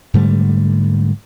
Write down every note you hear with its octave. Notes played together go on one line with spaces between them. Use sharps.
G#2 D3 G3 A3